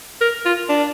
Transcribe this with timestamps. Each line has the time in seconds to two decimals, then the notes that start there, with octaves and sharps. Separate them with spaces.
0.21 A#4
0.46 F4
0.69 D4